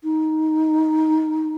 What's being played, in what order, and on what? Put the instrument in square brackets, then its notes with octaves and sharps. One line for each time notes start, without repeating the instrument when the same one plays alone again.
[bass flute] D#4